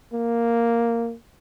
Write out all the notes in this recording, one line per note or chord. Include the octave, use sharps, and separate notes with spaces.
A#3